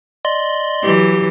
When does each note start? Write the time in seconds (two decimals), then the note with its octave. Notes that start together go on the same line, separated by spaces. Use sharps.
0.25 D5 D#5 C6
0.83 E3 F#3 G4